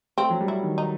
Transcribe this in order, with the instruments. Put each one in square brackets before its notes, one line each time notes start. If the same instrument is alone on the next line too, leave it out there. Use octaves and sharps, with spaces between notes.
[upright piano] A3 [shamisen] C4
[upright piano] F#3
G3
[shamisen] E4
[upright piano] D#3
[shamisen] D#4